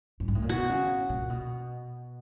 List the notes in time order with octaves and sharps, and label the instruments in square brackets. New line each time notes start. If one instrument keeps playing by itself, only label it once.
[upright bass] G2
G#2
A2
A#2
[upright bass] B2 [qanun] F#4
[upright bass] C#3
A#2
B2